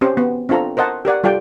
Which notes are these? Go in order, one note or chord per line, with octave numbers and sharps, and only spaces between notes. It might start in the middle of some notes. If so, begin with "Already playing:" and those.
C4 C#4 G4 C5
B3
C4 D4 F4 A4 A#5
A#4 C5 D#5 F#5 A5
G4 A#4 D5 F#5
G3 F4 A4 D5 G5